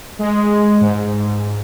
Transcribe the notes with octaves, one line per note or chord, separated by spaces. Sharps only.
G#3
G#2